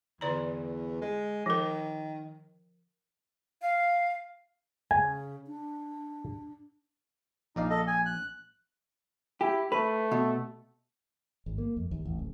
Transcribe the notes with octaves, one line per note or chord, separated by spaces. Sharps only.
E2 D3 D5 A#5
G#3
D#3 F3 A#4
F5
C#3 G#5
D4
A#1 D#4 D5 F5
A4 D#5
G#5
F#6
E4 G4
A3 B4
B2
G#1
A#3
F2
D#2
A1
D1